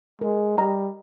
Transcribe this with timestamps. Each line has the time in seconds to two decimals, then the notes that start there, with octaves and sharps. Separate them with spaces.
0.21 G#3 A#4
0.58 G3 D#5 A#5